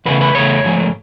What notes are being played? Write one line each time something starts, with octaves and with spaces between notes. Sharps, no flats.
E2 C#3 A3 B4
B4
E2 C#3 A3 C#5
G#2 F3 A3